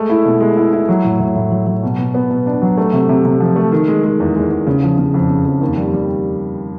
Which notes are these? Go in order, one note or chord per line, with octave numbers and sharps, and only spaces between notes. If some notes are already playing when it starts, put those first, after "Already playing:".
Already playing: G#3 A3
E4
B2
G#3
E4
E4
F#3
A2
A2
A2
F#3
F#3
B2
B2
B3
B2
D4
F#3
A3
C3
C3
C3
F3
A3
D#3
G#3
G#3
E2
G#3
E2
C#3
F3
C#3
F2
C#3
F2
D#2
G3
G3